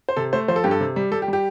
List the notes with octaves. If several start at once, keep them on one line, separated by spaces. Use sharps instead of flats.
C5
C3 A4
A3 C5
F3 C5
A4
G2 G4
A4
C3
G3
G3 A4
G4
G3
G4